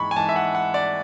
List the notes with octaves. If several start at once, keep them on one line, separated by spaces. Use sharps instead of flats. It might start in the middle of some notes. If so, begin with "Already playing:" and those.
Already playing: G#2 E3 B5 C#6
G#5
G#2 E3 A5
E5
F#5
F#5
D5